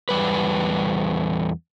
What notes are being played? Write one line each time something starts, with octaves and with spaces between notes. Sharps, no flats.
E2 G3 B4